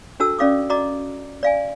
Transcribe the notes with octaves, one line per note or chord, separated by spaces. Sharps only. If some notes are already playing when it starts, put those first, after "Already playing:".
D4 F#4 A4 A5 E6
C#4 D5 F5 D6 D#6
F#4 D5 D#5 A#5 D6
D5 F5 G#5